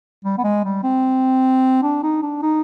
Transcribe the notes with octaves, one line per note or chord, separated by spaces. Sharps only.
G3
B3
G#3
G3
C4
D4
D#4
D4
D#4